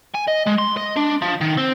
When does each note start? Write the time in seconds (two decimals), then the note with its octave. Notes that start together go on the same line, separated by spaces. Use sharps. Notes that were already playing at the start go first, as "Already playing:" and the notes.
0.15 G#5
0.28 D#5
0.47 G#3
0.59 C6
0.77 D#5
0.96 D4
1.22 F3
1.41 D#3
1.58 C4